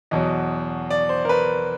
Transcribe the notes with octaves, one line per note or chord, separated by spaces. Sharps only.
E2 B2 F#3 D#5
D5
C5
A#4
B4